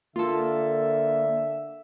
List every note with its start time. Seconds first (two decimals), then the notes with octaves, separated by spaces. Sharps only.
0.16 D3 A#3 F4 A4 E5